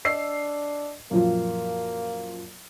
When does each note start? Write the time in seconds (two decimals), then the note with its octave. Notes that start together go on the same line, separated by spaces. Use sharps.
0.05 D4 D#5 E6 C7
1.11 F#2 A#2 F3 A#3